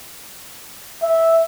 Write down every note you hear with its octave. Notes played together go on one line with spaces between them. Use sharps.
E5